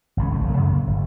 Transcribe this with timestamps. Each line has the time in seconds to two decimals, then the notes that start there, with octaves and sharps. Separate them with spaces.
0.17 G#1 C#2 C#4
0.30 C2 D3 A3
0.45 A#2 F3
0.57 F#2 C#3 F#3
0.73 A#3
0.87 G1